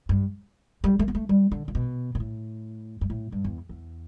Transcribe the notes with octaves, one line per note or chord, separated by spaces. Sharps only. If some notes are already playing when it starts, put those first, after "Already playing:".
G2
G3
A3
B3
A3
G3
D3
D3
B2
B2
A2
G2
A2
G2
E2
E2